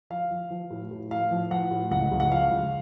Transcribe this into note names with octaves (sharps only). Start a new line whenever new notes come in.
F3 F5
F3
F3
A2
A2
A2 F5
F3
F3 F#5
A2
C#2 F#5
C#2
F#5
F3 F5
C#2